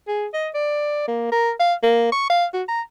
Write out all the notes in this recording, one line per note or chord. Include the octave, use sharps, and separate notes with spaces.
G#4
D#5
D5
A#3
A#4
F5
A#3
C#6
F5
F#4
A#5